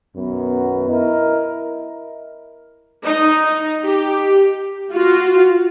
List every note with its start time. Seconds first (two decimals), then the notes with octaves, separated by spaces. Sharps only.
0.17 B1 F#2 D#3 B3
0.88 E4 A#4 D#5
3.05 D#4
3.85 G4
4.91 F4 F#4